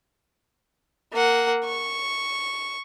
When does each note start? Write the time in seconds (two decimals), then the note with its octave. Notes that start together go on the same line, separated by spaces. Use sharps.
1.13 A#3 F#5
1.66 C#6